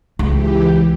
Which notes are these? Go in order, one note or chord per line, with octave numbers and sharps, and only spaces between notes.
C#2 E3 G4